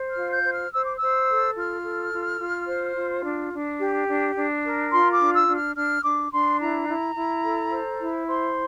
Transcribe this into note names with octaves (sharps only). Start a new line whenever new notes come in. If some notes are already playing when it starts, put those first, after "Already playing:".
Already playing: C5
F6
F4
G6
C5
F6
C5 E6
D6
C5 E6
A4
F4 F6
A4
F4
F4
C5
F4
D4
D4
G4
D4
D4
A#4
F4 C6
D6
D4
E6
D4
F6
D4 F6
D4 D6
D4 C6
E4 A#5
E4
E4
A4
C5
E4
C5 C6